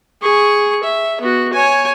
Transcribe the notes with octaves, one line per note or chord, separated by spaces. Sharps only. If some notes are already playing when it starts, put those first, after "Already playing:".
G#4 C#6
E5
B3 F#4
C#5 G#5